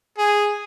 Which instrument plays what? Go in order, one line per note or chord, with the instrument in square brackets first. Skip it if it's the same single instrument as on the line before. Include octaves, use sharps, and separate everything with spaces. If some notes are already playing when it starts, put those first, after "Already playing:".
[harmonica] G#4